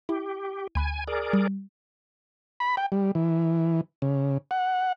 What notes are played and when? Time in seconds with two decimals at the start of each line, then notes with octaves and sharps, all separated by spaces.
0.09 E4 G4
0.75 D2 G#5 B5 F#6
1.07 G#4 A#4 D5
1.33 G3
2.60 B5
2.77 G5
2.92 G3
3.15 E3
4.02 C#3
4.51 F#5